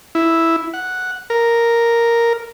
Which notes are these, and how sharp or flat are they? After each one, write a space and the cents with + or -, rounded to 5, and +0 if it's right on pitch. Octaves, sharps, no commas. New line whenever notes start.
E4 +0
F#5 -5
A#4 +0